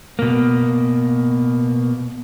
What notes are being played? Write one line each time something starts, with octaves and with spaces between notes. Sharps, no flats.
B2 A#3